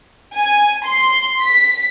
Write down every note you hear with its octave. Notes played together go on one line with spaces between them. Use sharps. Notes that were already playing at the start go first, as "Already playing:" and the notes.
G#5
C6
B6